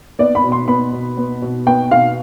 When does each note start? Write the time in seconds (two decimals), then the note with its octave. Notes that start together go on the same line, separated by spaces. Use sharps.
0.19 B3 D5
0.35 B5
0.44 B2
0.52 C6
0.68 B3 B5
0.92 B2
1.17 B3
1.42 B2
1.67 B3 G5
1.91 B2 F5